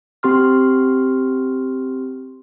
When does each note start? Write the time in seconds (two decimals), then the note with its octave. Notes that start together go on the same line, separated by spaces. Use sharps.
0.23 C4 G4 C6 F6